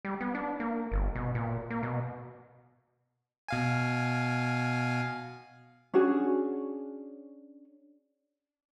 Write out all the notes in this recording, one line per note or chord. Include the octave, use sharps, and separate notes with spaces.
G3
B3
D4
A#3
G1
B2
A#2
A#3
B2
B2 F5 G#5
C#4 D4 F#4 G#4